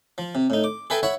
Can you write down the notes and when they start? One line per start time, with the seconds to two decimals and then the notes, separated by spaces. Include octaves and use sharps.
0.18 F3
0.35 C3
0.50 A2 D#4
0.64 D6
0.90 G#4 A4 B4 E5 G5 G#5
1.03 E4 C#5 E5 F#5